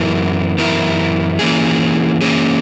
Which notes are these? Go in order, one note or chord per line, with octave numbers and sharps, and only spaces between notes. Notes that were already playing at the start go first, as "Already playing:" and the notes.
Already playing: F#2 E3 B3 E4 A#4
F#2 E3 B3 E4 A#4
E3 A#3 C#4 G#4
E3 A#3 C#4 G#4